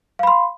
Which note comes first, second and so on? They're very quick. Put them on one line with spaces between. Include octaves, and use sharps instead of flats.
F5 B5 C6